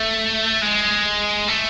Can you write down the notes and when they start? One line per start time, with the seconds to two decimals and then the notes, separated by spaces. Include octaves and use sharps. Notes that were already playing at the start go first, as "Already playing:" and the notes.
Already playing: A3
0.62 G#3
1.48 A3